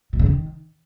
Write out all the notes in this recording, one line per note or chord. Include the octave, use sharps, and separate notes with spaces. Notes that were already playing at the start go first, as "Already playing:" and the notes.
B2
C#3
D#3